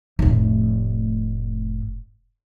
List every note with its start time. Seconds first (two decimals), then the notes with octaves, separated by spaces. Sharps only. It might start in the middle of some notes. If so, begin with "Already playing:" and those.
0.19 F1 A2